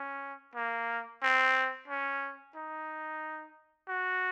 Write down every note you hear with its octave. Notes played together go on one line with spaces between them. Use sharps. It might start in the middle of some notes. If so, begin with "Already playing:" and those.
Already playing: C#4
A#3
C4
C#4
D#4
F#4